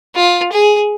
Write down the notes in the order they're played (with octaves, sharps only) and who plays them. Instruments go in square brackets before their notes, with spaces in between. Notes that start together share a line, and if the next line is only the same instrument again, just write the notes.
[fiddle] F4
G#4